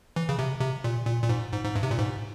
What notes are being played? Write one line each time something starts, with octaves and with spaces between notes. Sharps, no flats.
E3
C#3
C3
C3
A#2
A#2
A#2
G#2
G#2
G#2
G2
C3
A#2
G#2